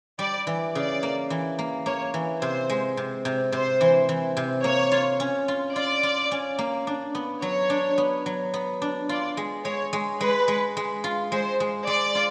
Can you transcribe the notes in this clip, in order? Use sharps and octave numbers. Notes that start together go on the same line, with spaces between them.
G3 D5
E3
C#3 D5
A#3
E3
A#3
A#3 C#5
E3
C3 C5
G#3
C3
C3
C3 C5
E3
E3
C3
A#3 C#5
F4
C#4
F4
F4 D5
F4
C#4
A#3
D4
B3
F#3 C#5
D4
B3
F#3
B3
D4
F4 D5
G#3
G#3 C#5
G#3
G#3 B4
G#3
G#3
F4
G#3 C5
G#3
G#3 D5
F4